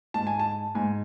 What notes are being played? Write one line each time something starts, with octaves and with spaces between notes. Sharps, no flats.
G#2 A5
G#5
A5
G#2 G#5